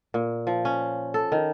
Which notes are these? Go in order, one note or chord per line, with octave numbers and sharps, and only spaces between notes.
A#2
F3
C#4
A4
D#3